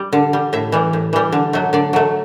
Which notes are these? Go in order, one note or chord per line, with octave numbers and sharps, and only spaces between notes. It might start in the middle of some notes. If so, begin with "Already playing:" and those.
Already playing: G3
D3
G3
A2 E5
E3 G3
A2
E3 G3
D3
F#3 A3
D3 D5
F#3 A3